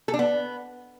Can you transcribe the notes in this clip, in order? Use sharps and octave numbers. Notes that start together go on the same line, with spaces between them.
A4
D4
B3